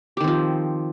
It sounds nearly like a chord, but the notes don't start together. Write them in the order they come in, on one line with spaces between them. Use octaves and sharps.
G4 D#3 C4 F3